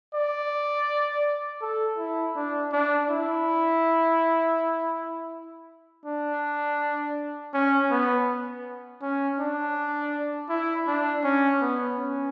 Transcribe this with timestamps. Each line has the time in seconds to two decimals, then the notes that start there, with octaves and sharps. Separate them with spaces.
0.14 D5
1.61 A4
1.99 E4
2.36 D4
2.73 D4
3.10 E4
6.06 D4
7.54 C#4
7.91 B3
9.02 C#4
9.40 D4
10.50 E4
10.87 D4
11.24 C#4
11.62 B3
11.98 C#4